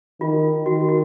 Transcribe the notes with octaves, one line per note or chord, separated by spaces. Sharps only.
D#3 F4
D#3 F#4
F#4